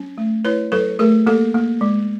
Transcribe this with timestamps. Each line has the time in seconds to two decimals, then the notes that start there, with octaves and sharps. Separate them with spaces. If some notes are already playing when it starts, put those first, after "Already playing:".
Already playing: F#3 C#4
0.18 A3
0.45 E4 B4 C#5
0.72 F#3 A4 B4
0.99 A3 G#4 A#4
1.27 A#3 G4 A4
1.54 A#3
1.81 G#3